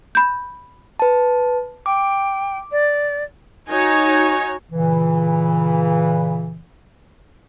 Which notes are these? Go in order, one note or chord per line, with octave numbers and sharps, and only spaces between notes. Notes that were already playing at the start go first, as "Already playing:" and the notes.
B5 G6
B4 A5
G5 D6
D5
D#4 F#4 C#5 G#5
A#2 C#3 E3